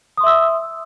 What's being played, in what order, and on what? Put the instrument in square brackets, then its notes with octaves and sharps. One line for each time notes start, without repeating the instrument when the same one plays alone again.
[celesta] D#6
C6
E5
E6